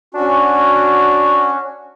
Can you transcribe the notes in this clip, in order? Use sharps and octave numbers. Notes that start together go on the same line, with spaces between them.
C#4 D4 F#4